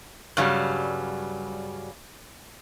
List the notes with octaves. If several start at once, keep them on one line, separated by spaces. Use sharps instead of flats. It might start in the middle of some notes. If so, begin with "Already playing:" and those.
G2 C#3 F#3 G3